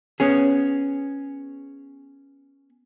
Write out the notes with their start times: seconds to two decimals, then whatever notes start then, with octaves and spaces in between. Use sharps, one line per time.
0.20 B3 C#4 G#4